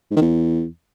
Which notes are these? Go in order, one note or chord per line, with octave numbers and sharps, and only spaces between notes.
G#2
D#3
E2